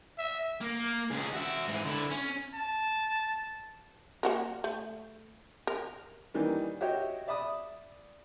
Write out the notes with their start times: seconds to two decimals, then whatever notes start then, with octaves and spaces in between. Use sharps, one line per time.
0.18 E5
0.61 A#3
1.10 C#2 G#4
1.33 F#4 E5
1.68 G#2 E3
1.85 D3 E4
2.11 C#4
2.55 A5
4.23 A#3 F#4 A#4
4.64 A3
5.67 A#4
6.34 D#3 E3 G3 A#3 C#4
6.81 F#4 G4 C#5 D#5 E5 G5
7.28 D5 E5 B5 D#6